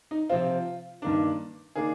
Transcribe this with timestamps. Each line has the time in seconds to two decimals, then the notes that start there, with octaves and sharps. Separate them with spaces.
0.11 D#4
0.29 C3 F3 C4 F4
1.02 G2 D#3 A#3 D4
1.75 D#3 A#3 D4 G#4